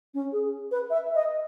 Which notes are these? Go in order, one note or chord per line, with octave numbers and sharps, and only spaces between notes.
C#4
G#4
B4
E5
D#5